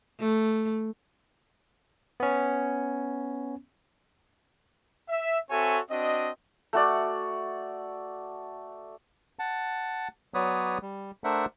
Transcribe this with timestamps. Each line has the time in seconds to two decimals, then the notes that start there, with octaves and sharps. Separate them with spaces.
0.19 A3
2.20 B3 C#4
5.09 E5
5.49 C4 F#4 A4 C#5 E5 G#5
5.90 C4 D4 F#4 D#5
6.73 A3 F#4 D5
9.39 F#5 A5
10.34 F#3 B3 B4 C#5 D5 D#6
10.82 G3
11.24 A3 D4 A#4 C5 E5 F#5